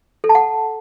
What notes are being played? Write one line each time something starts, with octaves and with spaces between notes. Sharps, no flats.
A4
A5
F#5